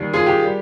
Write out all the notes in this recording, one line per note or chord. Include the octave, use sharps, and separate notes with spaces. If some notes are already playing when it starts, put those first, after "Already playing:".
Already playing: D#2 D#3 G3
F4 G#4
G4
G3